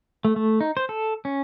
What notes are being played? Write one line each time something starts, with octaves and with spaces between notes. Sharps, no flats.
A3
A3
D#4
C5
A4
C#4